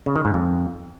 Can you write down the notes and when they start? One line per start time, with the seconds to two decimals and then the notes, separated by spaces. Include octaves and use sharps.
0.06 C#3
0.16 D#3
0.25 G#2
0.34 F2